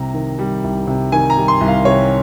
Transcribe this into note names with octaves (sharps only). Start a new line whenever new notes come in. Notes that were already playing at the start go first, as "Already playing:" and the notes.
Already playing: C2 C3 A#5
D#3
G3
C2
C3
D#3 G#5
A#5
G3
C6
C2
F5
C3 C#5